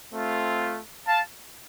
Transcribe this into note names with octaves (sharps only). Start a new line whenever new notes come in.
A3 C4 F4
F5 A5